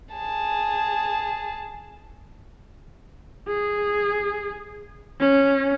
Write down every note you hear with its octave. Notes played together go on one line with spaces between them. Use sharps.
G#4 A5
G#4
C#4